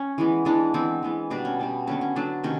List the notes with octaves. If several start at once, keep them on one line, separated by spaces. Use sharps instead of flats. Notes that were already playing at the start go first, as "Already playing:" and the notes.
Already playing: C#4
E3 G#3 B3
E3 G#3 B3 D4
E3 G#3 B3 C4
E3 G#3 B3
B2 G3 B3 D4
C#4
B2 G3 B3
D3 F#3 B3 C#4
C#4
D3 F#3 B3 D4
C3 D#3 C#4